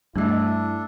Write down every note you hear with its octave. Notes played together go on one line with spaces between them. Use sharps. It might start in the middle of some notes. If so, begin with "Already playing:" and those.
G2 A3 D4 E4 A4 D#5